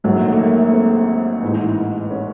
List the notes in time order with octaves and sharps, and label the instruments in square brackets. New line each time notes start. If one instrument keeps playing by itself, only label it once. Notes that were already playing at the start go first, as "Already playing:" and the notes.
[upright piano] A#1 G#2 D#3 F#3 A3
A3
A#3
C4
A1 G#2 E3
C#4